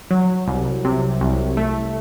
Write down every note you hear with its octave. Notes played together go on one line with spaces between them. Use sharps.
F#3
C2
C3
C2
A3